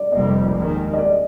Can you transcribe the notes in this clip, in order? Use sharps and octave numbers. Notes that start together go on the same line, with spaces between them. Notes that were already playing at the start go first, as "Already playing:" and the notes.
Already playing: D5
F1 F2 C3 G3 A#3 D#5
D#2 D#3 G#3
D#5
D5